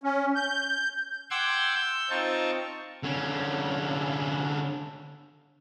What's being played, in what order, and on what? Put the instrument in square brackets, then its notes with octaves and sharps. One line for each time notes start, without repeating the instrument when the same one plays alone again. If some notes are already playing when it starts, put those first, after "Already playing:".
[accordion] C#4
G6
[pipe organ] F#5 G5 C6 D6 E6 G#6
E6 G6
C4 D#4 F4 A5 C#6
[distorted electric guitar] D3 C#4